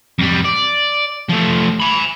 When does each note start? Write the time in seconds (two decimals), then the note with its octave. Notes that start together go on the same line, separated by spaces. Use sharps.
0.19 F2 G3
0.45 D5
1.29 F3 A3
1.80 G#5 B5